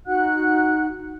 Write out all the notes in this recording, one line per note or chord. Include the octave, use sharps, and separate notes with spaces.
D#4 F#4 F#5 F#6